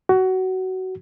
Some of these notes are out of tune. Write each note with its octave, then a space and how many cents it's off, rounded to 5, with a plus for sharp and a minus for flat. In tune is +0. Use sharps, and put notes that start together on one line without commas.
F#4 +20